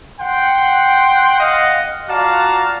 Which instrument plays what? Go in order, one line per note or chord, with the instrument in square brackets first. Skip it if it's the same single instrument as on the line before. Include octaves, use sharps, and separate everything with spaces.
[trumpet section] F#5 G5 C6
D#5 F5 F#5
F4 F#4 D5 F5 A5 A#5